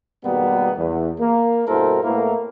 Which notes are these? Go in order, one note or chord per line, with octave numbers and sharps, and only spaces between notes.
G#1 B2 G3 A#3 B3
E2
A#3
G2 B2 E4 A4 A#4 C5
A2 A#3 B3 E4 A#4